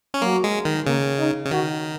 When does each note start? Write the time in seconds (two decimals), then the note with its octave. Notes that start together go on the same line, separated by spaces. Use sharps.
0.14 C#4
0.22 F#3 A#3
0.44 G#3
0.65 D#3
0.86 C#3 A#3
1.19 D#4
1.45 C#3
1.51 D#3 F#4